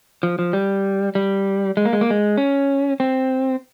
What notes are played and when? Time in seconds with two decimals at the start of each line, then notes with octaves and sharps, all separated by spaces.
0.23 F3
0.39 F3
0.53 G3
1.15 G3
1.77 G#3
1.85 A#3
1.93 G#3
2.01 A#3
2.10 G#3
2.37 C#4
3.00 C4